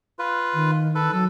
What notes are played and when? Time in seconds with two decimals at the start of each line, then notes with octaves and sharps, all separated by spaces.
0.19 F4 B4
0.54 D#3
0.95 A4 B4
1.12 F#3 A4